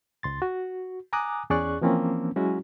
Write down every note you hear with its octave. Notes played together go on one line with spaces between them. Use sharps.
C#2 C6 A6
F#4
G#5 A#5 D6 D#6 F#6
E2 C#4 G#4 D5 C#6 F#6
E3 F3 A#3 C4 C#4
F#3 G#3 C#4 E4 F#4